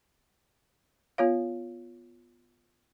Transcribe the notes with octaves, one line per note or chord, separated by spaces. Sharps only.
B3 F4 C#5 F5